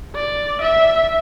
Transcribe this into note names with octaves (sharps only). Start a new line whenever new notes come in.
D5
E5